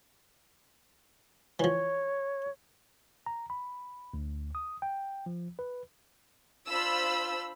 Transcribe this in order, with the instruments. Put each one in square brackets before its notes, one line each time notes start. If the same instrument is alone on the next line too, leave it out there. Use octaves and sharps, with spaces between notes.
[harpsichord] E3 F3 [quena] C#5
[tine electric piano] A#5
B5
D2
D#6
G5
F3
B4
[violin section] D4 F4 C5 B5 E6